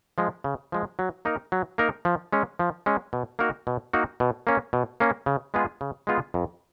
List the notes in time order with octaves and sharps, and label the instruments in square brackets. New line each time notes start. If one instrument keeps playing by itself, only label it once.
[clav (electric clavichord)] F3 G#3
C#3
F3 G#3
F#3
A#3 D#4 A#4
F#3
A#3 D#4 A#4
F3
G#3 C#4
F3
G#3 C#4
B2
A#3 D#4 F#4 A#4
B2
A#3 D#4 F#4 A#4
B2
A#3 C#4
B2
A#3 C#4
C#3
G#3 B3 F4 G#4
C#3
G#3 B3 F4 G#4
F2